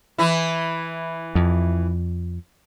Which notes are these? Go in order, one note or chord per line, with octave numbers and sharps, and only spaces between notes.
E3 E4
F2